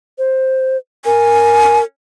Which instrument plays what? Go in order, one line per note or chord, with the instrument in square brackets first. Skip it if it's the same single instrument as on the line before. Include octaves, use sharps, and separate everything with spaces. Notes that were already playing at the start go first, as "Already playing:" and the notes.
[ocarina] C5
[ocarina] A#4 [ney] G#5